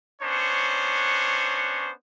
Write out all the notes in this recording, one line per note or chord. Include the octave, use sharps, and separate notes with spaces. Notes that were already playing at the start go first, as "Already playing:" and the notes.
B3 C#4 D4 C5 C#5